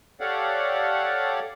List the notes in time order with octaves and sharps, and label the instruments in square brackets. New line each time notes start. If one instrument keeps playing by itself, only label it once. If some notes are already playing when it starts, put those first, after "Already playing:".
[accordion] G4 A4 C#5 D5 F5 F#5